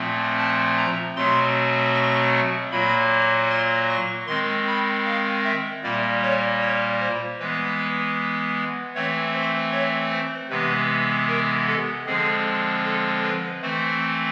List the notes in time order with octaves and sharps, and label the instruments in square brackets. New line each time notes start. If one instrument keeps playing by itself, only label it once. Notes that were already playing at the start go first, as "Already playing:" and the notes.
Already playing: [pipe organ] A#2 F3 A3 C4
A5
A#5
B2 F#3 A3 C4 C6
C#6
A#2 F#3 A#3 B5
C6
C#6
D#3 G#3 C4 C6
B5
F5
E5
A#2 G3 A#3 D5
C#5
C#5
C5
E3 G#3 B3 B4
E3 A3 C4 C#5
C5
C#5
C5
C3 E3 G#3 B3 B4
A#4
A4
D3 F3 G#3 C4 G#4
A4
B4
E3 A3 C4 C5